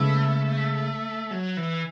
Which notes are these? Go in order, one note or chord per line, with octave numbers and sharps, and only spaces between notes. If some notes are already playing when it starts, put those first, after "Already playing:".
Already playing: C#3 G#3 A3 B3 E4
F#3
E3